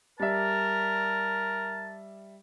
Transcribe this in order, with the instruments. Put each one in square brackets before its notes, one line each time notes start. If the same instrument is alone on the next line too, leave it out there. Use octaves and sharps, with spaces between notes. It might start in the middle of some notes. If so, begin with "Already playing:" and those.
[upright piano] G3 D5 E5 [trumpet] A#4 [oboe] A5